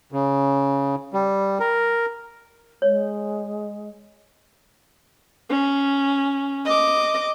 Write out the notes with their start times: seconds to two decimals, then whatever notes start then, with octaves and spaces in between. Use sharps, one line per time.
0.12 C#3
1.14 G3
1.60 A#4
2.82 G#3 C#5
5.50 C#4
6.65 D#5 D6